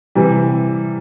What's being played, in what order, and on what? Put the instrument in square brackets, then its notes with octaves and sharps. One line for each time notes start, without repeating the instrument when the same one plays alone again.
[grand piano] C3 E3 G3